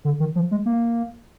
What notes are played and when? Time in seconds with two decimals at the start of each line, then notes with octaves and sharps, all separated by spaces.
0.05 D3
0.20 D#3
0.36 F3
0.51 G#3
0.66 A#3